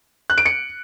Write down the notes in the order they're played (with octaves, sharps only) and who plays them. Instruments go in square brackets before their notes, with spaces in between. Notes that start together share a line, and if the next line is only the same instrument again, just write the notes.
[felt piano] F#6
D7
C#7